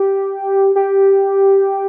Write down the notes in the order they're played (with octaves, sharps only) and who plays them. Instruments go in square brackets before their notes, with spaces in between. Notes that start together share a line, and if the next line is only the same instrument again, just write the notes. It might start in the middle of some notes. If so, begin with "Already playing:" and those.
Already playing: [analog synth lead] G4
G4